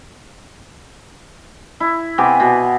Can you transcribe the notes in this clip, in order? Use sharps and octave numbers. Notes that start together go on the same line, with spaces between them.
E4
C3 B3 G#5 D6
B2